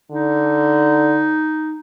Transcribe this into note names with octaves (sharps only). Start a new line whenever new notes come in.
D3 D#4